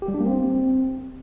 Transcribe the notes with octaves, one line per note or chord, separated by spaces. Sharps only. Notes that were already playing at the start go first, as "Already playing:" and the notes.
G4
G3
D4
A#3
C4